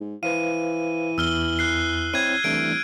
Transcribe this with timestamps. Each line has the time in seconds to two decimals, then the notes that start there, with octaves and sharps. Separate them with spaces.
0.01 G#2
0.23 E3 B4 C5 F5 D#7
1.18 E2 E6 F6 G7
1.59 F#6 C7
2.14 C4 E4 C#5 G#6 D#7
2.44 C2 E3 A3 D4 D7